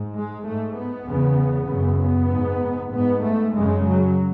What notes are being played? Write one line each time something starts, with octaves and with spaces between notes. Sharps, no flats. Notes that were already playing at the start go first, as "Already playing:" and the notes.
Already playing: G#2
G#3
G#2 A3
B3
E2 C#3
F#2 C#3
B3
G#2
G#2 B3
A3
F#2 C#3 G#3
F#3